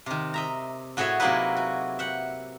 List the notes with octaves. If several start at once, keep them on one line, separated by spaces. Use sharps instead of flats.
C3 D#3
D#5 E5 A#5
A2 F#4 G#4 C#5 D#5 E5
C3 F#3 A#3 D#4 E4 B4
F#4
E5 F#5 G5